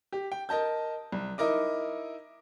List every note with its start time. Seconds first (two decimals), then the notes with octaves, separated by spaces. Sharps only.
0.12 G4
0.32 G5
0.49 A#4 D#5 A5 G6
1.12 C2
1.38 D#4 E4 A#4 D#5 D6